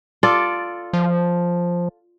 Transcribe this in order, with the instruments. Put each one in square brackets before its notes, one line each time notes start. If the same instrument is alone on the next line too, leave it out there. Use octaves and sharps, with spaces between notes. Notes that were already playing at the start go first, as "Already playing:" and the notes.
[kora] F4 A4 D5
[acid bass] F3